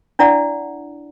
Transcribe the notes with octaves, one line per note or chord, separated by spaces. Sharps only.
D4 E4 D5 F#5